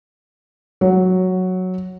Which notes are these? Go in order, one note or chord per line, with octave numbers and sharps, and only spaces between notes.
F#3